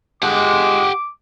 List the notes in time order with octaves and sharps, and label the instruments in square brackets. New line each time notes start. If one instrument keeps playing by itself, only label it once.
[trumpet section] G#3 [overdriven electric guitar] G4 F#5 [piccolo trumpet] D6